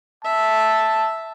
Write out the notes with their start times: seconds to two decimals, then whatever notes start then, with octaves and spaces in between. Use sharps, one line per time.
0.24 E5 A5